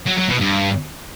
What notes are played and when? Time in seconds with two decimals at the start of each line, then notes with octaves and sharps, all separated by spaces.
0.06 F#3
0.17 F#3
0.29 B2
0.40 G2